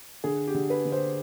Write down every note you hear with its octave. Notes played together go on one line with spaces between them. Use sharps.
D3 G#4
G4
D3
B4
D3
C5